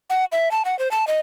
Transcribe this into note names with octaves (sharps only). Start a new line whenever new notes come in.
F#5
E5
A5
F#5
C5
A5
D#5